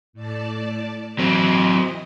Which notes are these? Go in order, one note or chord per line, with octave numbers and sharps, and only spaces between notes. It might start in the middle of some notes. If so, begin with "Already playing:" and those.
A2 D5 A5
E3 F#3 C4 D#5